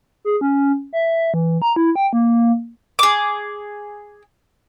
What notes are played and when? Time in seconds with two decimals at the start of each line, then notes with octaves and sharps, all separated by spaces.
0.25 G#4
0.41 C#4
0.93 E5
1.34 E3
1.62 A#5
1.76 E4
1.96 G5
2.13 A#3
2.99 G#4 D6